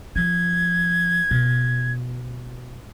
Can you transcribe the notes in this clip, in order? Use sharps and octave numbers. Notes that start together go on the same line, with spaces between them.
F3 G#6
B2